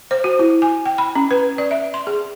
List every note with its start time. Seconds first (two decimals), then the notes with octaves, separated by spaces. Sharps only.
0.11 C5
0.24 F#4
0.39 E4
0.62 G#5
0.85 G5
0.98 B5
1.15 C#4
1.31 B4
1.58 D5
1.71 E5
1.94 C6
2.07 G#4